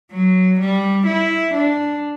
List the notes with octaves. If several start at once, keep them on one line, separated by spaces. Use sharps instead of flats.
F#3
G3
E4
D4